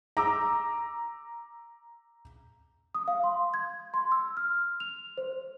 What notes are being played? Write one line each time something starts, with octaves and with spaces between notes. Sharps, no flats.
A#5 D6 E6
D#6
F5
C6
G#6
C6
E6
F6
F7
C5